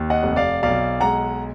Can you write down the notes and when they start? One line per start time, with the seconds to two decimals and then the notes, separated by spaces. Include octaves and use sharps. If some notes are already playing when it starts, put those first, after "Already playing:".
Already playing: D#2
0.10 D#5 F#5
0.23 F1
0.36 D5 F5
0.63 B1 D5 F5
1.00 G#3 F#5 A#5